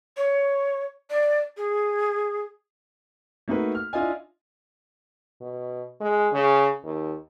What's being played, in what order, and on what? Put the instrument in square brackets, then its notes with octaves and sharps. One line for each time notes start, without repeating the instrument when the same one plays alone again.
[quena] C#5
D5
G#4
[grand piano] A3 A#3 D#4 F#4 B4
F6
D4 E4 F4 D#5 G#5
[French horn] B2
G#3
C#3
D#2